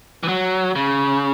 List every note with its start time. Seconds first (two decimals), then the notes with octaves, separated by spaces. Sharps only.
0.23 E3
0.28 F#3
0.76 C#3